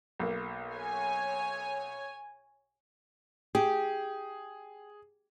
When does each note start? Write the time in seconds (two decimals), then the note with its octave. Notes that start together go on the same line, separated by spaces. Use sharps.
0.19 B1 A#3
0.75 C#5 G#5
3.55 G4 G#4